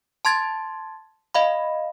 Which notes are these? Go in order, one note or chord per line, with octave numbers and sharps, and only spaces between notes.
A5 C6 G#6 A6
D#5 F5 B5